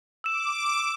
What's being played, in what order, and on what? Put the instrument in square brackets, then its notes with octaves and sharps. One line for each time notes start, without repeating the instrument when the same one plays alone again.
[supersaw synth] D6 [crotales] E6 E7